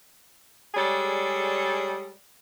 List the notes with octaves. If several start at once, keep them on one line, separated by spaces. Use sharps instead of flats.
G3 G#3 G#4 A4 C#5 D5